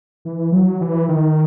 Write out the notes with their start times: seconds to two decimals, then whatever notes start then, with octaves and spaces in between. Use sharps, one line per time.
0.25 E3
0.52 F#3
0.81 E3
1.08 D#3